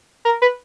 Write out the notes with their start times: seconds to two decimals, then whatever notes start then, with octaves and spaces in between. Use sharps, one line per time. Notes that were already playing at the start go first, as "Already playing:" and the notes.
0.25 A#4
0.42 B4